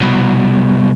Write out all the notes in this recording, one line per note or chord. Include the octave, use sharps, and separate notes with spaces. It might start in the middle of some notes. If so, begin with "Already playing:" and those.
C2 B2